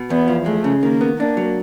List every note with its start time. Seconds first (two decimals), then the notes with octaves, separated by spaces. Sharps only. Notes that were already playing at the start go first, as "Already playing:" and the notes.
Already playing: B2
0.10 E2 B3
0.28 F3
0.46 G#3 A3
0.64 C#3
0.83 D#3 A#3
1.01 B3
1.19 A#3 D4
1.37 F#3